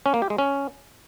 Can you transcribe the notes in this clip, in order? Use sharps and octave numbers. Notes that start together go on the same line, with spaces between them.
C#4
A#3
G4
G#3
C#4